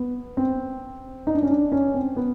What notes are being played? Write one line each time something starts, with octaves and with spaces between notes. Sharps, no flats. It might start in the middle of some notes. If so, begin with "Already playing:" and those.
Already playing: B3
C4
D#4
D4
C#4
D4
C#4
C4
B3